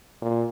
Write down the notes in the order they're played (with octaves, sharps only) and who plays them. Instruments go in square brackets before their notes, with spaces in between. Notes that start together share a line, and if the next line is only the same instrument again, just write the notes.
[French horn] A#2